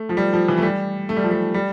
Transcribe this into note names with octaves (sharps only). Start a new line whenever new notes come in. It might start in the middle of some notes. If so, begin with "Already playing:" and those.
Already playing: A3
F3
G3
F3
E3
A3
G3
A3
G3
F3
G3
G3